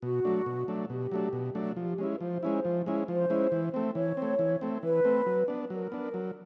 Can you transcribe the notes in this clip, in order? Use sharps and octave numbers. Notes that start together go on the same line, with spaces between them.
B2 F#4
F#3 A3 D4
B2
F#3 A3 D4
B2 G4
F#3 A3 D4
B2
F#3 A3 D4
F3 G4
G#3 C#4 E4
B4
F3 C5
G#3 C#4 E4
F3
G#3 C#4 E4
F3 C5
G#3 C#4 E4
E3
A3 C4
E3 C#5
A3 C4
E3
A3 C4
E3 B4
A3 C4
F#3
B3 D4
B4
F#3 A#4
B3 D4
F#3